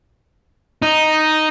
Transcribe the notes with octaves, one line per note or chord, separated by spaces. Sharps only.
D#4